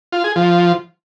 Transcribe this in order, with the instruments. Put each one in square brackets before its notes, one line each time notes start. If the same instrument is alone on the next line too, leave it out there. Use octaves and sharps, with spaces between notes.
[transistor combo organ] F4
G#4
F3